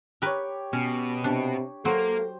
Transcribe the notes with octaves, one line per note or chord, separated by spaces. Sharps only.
G4 A#4 B4 C#5
B2 C#4
C3 D4
F#3 A#3 A4 C5